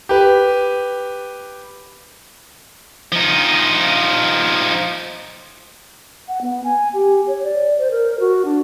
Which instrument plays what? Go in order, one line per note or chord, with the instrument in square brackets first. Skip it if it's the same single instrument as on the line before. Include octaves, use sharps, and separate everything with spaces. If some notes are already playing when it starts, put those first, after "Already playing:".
[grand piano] G4 B4
[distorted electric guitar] F3 D#4
[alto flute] F#5
B3
G#5
G4
C#5
D5
C5
A#4
F#4
D4